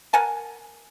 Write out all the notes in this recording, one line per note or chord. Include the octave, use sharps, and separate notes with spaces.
A#4 F#5 G#5 A5